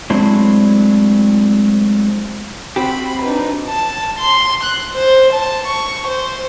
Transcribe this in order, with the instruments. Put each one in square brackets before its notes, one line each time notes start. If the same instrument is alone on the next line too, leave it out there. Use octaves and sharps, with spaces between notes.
[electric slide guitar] F#3 G#3 A3 C4 D4 E4
[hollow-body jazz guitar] C4 F#4 G4 [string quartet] B5
[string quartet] D4 D#4 B4
[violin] A5
C6
F#6
C5
A5
C#6
C5